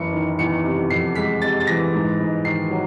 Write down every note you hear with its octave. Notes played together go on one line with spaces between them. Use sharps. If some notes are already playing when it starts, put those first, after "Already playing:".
Already playing: F#1 E3 C#7
D#3
E2 C#7
C3
F2 C7
G#3 B6
C3 A6
A6
E3 A#6
G#2
G#2
D#3 C7
F#3